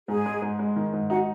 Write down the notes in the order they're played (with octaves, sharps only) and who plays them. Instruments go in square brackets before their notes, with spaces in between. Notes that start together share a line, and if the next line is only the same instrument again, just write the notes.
[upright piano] G#2 [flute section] G#4 G#5
[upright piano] G#3
G#2
G#3
D#3
G#2
[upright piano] D#4 [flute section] F#4 F#5